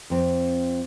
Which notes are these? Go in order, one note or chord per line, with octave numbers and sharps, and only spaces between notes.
F2 C4